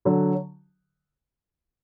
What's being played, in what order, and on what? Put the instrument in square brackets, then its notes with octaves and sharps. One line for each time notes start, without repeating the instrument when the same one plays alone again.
[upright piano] D3 F#3